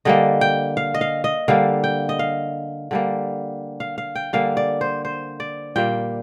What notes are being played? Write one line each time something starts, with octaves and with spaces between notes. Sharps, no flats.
D3 G3 A#3 D#5
G5
F5
D#5
F5
D#5
D3 G3 A#3 F5
G5
D#5
F5
D3 G3 A#3
F5
F5
G5
D3 G3 A#3 F5
D5
C5
C5
D5
A#2 G3 A#3 G5